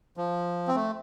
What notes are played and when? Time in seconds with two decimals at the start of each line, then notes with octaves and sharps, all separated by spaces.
0.17 F3
0.68 C4
0.75 A3